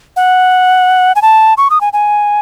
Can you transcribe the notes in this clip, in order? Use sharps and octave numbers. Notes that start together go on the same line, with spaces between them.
F#5
G#5
A5
C#6
D#6
G#5
G#5